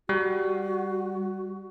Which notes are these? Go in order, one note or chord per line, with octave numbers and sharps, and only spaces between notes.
G3 F#4